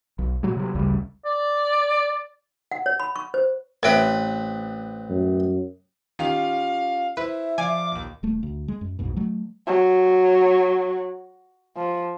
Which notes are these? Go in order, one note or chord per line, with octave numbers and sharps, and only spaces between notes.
B1
A#2 F#3 G#3
C3 F#3
A1 D2 C#3 G3
D5
F#5
C#5
B5
C#6
C5
A1 C4 A#4 B4 E5
F#2
D#3 C#4 F4 G4 F5
E4 B4 C5 E5
F3 D5 F5 G#5 D6
A#1 D#2
D#1 A3
D2
G#3
F#2
B1 F2 G#2 B2
F#3 A3
F#3
F3